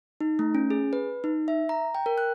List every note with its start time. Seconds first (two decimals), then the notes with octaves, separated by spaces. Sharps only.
0.21 D#4
0.39 A3
0.55 C#4
0.70 G#4
0.93 B4
1.24 D#4
1.48 E5
1.69 A#5
1.95 G5
2.06 A#4
2.18 F#6